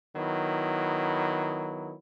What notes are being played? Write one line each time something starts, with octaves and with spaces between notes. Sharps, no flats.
D#3 F#3 B3 E4